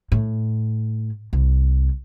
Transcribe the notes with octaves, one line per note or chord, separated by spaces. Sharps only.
A2
C2